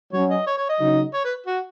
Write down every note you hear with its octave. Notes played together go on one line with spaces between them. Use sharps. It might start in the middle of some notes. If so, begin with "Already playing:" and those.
F#3 C#4 C#5
D#5
C#5
C#5
D#5
C#3 F#3 D#4
C#5
B4
F#4